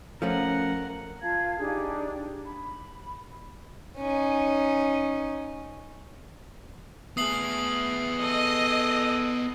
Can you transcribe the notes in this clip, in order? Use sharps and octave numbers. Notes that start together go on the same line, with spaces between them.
F3 A3 C#4 A#4 F#5
F4 F5 A5 G#6
D4 D#4 G4 G#4
B5
C#4 D#4
A3 B3 G#4 D#6 C7 F#7
A4 D#5